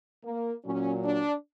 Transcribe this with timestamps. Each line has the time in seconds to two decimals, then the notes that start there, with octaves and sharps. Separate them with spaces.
0.24 A#3
0.64 A#2 F#3 C#4
1.04 D4